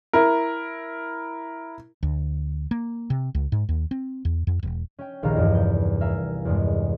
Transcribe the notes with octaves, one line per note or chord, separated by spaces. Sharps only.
E4 A#4
D2
A#3
C3
C#2
G#2
D#2
C4
E2
F2
E1
C#4 G5
D#1 A#1 D#3 F5 A#5
E2 G2
C2 G6
A#4 E5 F5 G#5
E2 G2 G#3